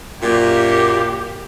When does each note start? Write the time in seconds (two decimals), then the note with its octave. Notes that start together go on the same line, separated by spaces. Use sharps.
0.22 F#2 A#2 G4